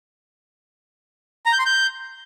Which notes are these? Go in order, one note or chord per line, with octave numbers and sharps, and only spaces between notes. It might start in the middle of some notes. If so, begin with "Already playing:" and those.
A#5
G6
C6
G6